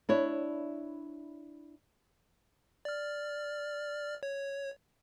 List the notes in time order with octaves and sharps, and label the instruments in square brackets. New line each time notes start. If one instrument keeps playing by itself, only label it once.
[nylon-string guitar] D4 E4 C#5
[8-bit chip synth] D5 F6
C#5